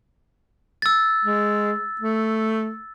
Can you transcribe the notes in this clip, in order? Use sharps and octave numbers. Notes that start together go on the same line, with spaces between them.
E6 A6
G#3
A3